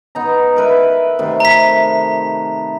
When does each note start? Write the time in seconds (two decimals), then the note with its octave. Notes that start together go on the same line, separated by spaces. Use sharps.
0.15 B3 D#4 A#5
0.56 A#4 B4 E5
1.19 C3 D#3 A3
1.40 A#5 B6